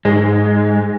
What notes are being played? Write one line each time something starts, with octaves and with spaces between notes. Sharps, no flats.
G#2 G#3